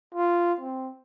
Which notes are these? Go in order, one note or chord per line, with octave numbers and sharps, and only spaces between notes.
F4
C4